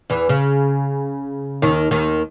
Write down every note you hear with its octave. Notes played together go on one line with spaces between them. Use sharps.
E2 E3
C#3
D#2 D#3
D#2 D#3